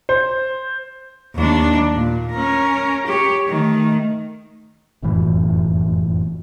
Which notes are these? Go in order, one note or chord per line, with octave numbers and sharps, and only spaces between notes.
C5
D#2 D4
A#2
C#4 A#4
G4 C#5
D#3 A3
F1 F#2 A2 E3